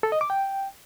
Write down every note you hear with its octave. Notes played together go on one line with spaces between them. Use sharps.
A4
D#5
D6
G5